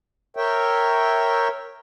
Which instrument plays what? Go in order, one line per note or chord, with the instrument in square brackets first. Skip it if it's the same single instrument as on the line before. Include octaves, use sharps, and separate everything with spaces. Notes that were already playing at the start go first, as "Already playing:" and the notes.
[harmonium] A#4 C#5 E5 G5